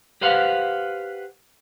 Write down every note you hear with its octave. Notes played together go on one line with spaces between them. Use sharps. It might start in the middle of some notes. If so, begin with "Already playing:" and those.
G4 B4 C5 F5 F#5